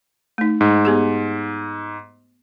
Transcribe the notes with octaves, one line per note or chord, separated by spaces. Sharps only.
A3 D#4
G#2
B3 G4 G#4